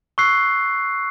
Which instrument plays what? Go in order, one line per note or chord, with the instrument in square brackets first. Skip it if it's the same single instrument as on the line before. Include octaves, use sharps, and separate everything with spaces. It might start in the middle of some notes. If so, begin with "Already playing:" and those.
[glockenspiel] C#6 E6 F#6 C7